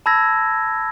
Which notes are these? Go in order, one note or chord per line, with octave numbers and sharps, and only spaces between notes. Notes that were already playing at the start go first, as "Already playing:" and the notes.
A5 B5 E6 G#6 A#6